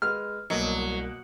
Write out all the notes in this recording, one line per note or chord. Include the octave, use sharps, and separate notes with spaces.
G#3 B4 F6
C2 B2 F#3 A#3 D#5